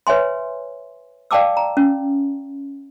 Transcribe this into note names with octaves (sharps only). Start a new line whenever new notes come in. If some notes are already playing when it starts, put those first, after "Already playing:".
B4 C#5 E5 G#5 C6
D5 F5 G5 A5 D6 E6
A#5
C#4